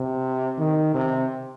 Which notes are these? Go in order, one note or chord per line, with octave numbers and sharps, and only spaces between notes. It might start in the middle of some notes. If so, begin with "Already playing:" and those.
Already playing: C3
D#3
C3